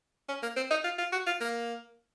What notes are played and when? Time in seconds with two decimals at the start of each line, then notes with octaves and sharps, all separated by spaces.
0.29 C#4
0.43 A#3
0.56 C4
0.70 D#4
0.84 F4
0.98 F4
1.12 F#4
1.27 F4
1.41 A#3